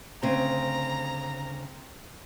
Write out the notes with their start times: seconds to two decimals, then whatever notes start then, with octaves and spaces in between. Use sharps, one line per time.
0.23 D2 C#3 C4 A#5